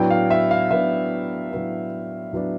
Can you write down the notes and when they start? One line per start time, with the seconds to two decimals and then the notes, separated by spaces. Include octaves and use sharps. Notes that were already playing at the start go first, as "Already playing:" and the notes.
Already playing: A2 F#3 B3 D4 G5
0.10 F5
0.31 E5
0.51 F5
0.70 A2 F#3 B3 D4 E5
1.51 A2 F#3 B3 D4
2.33 A2 F#3 B3 D4